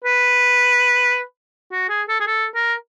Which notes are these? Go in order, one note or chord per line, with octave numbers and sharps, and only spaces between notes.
B4
F#4
G#4
A4
G#4
A4
A#4